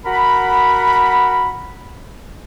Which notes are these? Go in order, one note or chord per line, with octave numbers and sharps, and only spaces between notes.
F#4 A#4 F#5 A#5 B5